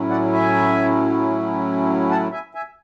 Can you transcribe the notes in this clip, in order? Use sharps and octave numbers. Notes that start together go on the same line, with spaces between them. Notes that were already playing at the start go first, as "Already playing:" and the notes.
Already playing: A2 F#3 C#4 E4
D5 F#5
E5 G#5
F#5 A5
E5 G#5
E5 G#5